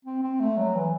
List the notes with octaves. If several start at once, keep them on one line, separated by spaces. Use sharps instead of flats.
C4
C4
A3
F#3
E3